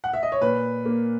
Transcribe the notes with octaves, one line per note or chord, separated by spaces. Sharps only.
F#5
E5
D#5
C#5
A#2 B4
A#3